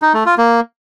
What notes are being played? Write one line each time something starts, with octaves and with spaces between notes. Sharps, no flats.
D#4
A3
F4
A#3